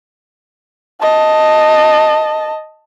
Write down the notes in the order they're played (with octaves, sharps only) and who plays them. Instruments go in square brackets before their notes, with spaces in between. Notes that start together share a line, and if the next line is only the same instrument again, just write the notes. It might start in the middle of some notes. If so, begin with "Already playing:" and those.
[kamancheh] D#5 A5